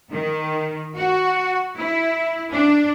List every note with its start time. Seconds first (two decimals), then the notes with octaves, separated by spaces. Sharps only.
0.11 D#3
0.96 F#4
1.77 E4
2.51 D4